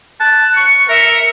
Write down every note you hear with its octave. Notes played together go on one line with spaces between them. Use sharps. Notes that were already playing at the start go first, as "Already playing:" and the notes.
A5 F#6
C#6 C#7
A#4 E5